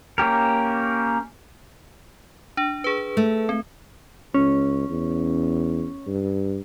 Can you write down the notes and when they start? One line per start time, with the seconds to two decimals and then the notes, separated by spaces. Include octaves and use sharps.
0.18 A#3 C#4 G4 A#4
2.57 D4
2.84 G#4 B4
3.17 A3
3.49 C4
4.34 C#2 C#4
4.89 E2
6.07 G2